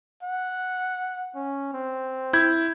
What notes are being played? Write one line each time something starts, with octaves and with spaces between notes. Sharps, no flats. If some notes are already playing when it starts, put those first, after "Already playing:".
F#5
C#4
C4
E4 G6 G#6